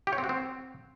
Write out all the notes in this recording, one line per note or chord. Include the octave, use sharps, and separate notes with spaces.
G4
C#5
C4
F#4
C4